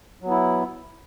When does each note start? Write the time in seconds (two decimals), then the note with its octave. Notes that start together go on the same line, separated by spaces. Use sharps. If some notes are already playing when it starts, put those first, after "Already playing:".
0.22 F#3
0.26 B3
0.31 E4